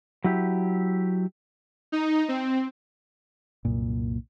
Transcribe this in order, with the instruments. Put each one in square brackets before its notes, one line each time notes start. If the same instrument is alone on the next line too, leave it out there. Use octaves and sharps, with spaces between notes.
[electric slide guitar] F#3 E4 G4
[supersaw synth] D#4
C4
[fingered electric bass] C2 F#2 A#2